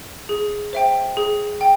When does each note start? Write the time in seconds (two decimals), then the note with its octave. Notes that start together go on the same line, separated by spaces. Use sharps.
0.29 G#4
0.73 C5 E5 G5
1.17 G#4
1.61 G5